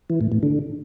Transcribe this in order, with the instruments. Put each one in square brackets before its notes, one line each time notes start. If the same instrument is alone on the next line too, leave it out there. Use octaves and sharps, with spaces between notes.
[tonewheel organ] E3
A2
A2
D3